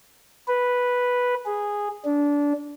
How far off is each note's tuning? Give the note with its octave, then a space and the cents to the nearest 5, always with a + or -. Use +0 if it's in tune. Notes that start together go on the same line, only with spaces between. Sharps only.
B4 -5
G#4 -10
D4 -20